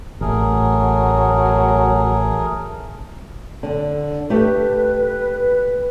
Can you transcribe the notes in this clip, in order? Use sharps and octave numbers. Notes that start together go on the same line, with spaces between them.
A1 F#3 A3 G#4 A#4
D3
A3 G4 B4